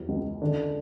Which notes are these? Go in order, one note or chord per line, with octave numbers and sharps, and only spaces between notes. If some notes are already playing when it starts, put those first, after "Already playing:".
Already playing: E2 F#3
C#2
D3